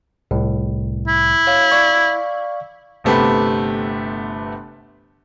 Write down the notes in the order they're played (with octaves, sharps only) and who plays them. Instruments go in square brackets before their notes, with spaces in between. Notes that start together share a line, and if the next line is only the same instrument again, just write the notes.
[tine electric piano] C2 A2
[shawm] E4
[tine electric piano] C#5 F5
D5 F5 C#6
[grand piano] G1 C3 A3 B3 G4 B5